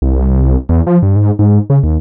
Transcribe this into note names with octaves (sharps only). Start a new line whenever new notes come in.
C2
E2
F3
G2
G#2
G#2
C#3
D#2